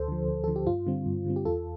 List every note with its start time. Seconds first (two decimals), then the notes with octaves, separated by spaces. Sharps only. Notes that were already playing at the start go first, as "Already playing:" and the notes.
Already playing: D2 A4 C5
0.08 D3 F3
0.28 D2
0.44 D3 F3 A4
0.56 G4
0.67 G2 F4
0.87 D3 G3 C4
1.06 G2
1.25 D3 G3 C4
1.36 G4
1.45 E2 F4 A4